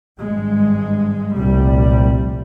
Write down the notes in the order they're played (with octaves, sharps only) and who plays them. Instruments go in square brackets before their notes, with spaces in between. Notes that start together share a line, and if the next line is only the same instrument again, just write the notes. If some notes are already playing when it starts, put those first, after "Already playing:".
[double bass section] G#1 G2 G#3
F1 C2 A#2 G3